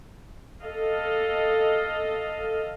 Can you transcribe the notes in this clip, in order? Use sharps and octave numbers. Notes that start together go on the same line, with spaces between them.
A4 D#5 F5